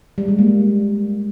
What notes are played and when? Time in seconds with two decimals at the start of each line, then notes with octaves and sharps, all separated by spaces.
0.18 G3
0.28 G#3
0.39 A#3